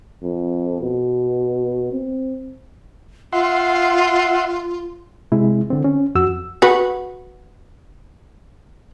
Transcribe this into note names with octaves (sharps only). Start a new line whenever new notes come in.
F2
B2
C4
F4 E5 F#5 C6
C3 G#3 E4
D3 C4
C#4
F2 F#4 E6
F#4 B4